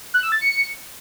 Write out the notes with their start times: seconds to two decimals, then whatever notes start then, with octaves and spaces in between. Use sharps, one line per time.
0.14 F#6
0.23 E6
0.32 A6
0.41 C#7